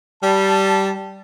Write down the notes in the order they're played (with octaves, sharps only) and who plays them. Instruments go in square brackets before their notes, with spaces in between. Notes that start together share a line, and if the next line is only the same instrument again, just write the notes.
[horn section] G3 A5